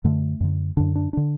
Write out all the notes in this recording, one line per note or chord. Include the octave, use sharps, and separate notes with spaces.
F#2 D3 A3
F#2 D3
F#2 D3 D4
D4
D3 D4